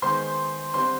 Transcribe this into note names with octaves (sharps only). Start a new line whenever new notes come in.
D#3 G#3 B3 C5 C6
D3 G3 C4 C5 C6